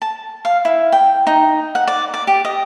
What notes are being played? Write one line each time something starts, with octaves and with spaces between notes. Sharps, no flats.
A5
F5
E4
G5
D#4
F#5
D5
D5
G4
D#5